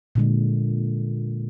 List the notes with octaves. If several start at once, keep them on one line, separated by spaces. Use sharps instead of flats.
A#2 D3 G#3